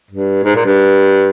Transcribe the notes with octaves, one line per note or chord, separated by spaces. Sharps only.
G2
G#2
A#2
G2